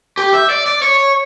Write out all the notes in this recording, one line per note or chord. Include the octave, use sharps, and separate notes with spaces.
G4
E5
D5
D5
C#5